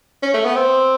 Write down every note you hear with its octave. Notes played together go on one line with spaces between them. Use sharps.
C#4
A3
B3
C4